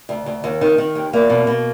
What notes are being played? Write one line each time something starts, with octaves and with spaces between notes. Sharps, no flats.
D2
D2
D#2
D#3
D#3
D#2
E2 A#3
B2
B2